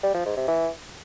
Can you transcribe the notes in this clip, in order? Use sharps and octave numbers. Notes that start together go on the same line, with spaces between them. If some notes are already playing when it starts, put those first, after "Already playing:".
G3
F3
G#2
C3
E3